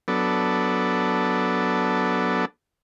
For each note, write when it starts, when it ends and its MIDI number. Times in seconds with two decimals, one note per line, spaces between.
0.08 2.45 54
0.08 2.45 59
0.08 2.45 62
0.08 2.45 69